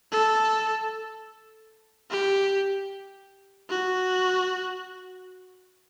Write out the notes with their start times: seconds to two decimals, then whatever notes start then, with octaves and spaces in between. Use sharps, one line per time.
0.12 A4
2.11 G4
3.70 F#4